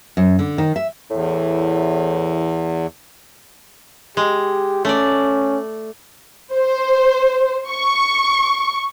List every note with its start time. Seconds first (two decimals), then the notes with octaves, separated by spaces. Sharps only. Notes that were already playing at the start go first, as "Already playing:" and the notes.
0.17 F#2
0.39 D3
0.58 D#3
0.76 E5
1.10 E2 A2
4.17 G#3 G4
4.85 A3 C#4 D5
6.55 C5
7.69 C#6